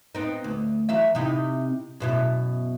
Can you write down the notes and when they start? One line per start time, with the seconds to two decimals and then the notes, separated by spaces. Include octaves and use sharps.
0.15 B3 C4 D#4
0.44 D2
0.89 E3 F#3 E5
1.15 C3 D#4 E4
2.00 F#2 B2 E4